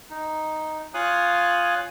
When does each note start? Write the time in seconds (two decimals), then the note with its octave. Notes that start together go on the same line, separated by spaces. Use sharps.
0.10 D#4
0.94 F4 C#5 F5 G#5 D#6 F#6